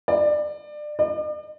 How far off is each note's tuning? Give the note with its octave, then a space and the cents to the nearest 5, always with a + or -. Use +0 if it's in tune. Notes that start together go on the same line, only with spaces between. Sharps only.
D5 +25
D5 +40